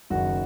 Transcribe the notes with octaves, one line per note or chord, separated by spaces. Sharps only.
F#1 F#2 D#3 F#4